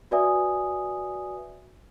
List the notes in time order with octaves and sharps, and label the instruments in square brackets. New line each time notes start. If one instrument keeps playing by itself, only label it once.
[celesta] F#4 B4 D5 E5 G#5 D#6